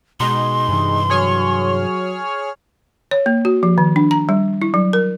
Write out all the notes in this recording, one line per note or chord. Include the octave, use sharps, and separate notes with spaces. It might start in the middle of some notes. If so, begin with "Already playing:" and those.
B2 G#3 D#4 C6
G2 C3 E3
F#3 G#4 C#5 F6
C#5
A#3
F#4
F3
D#3
D4
A#5
G3
E4
F#3
A#4